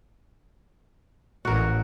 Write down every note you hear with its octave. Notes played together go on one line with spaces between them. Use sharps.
A1 F#4 A#4